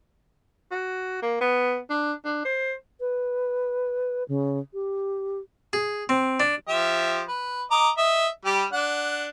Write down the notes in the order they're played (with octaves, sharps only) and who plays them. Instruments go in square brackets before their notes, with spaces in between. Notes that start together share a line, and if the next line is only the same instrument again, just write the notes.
[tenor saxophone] F#4
A#3
B3
D4
D4
C5
[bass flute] B4
C#3
G4
[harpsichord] G#4
C4
D4
[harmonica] F3 G4 E5
B4
D#5 A#5 D6
D#5 E5
G3 G4
D4 F#5